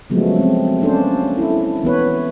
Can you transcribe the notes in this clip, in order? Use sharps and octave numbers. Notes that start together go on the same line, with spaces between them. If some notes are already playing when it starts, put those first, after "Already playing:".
C#3 F3 F#3 G#3 A3 B3
C4
A#3 C#4 D4 A4 C5
E4 A4
E3 B3 B4 C#5